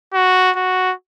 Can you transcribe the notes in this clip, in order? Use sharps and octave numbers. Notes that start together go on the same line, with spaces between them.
F#4
F#4